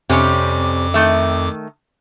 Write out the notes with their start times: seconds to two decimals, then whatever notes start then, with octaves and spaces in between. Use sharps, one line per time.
0.10 F2 C3 G3 C#4 D6
0.94 D#3 A3 E5